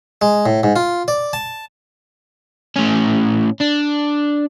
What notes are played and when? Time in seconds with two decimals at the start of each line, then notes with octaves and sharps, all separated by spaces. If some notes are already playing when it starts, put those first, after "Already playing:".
0.22 G#3
0.46 A2
0.63 G#2
0.76 F4
1.08 D5
1.33 A5
2.76 A2 C#4
3.61 D4